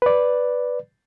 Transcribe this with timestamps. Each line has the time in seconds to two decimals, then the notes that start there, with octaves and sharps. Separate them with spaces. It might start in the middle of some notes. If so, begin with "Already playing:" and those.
0.02 B4 D5